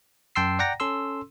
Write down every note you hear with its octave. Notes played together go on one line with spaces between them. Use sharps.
F#2 G5 A5 C6 E6 C7
D5 F#5 G5 A#5 A#6
C#4 A4 C6 E6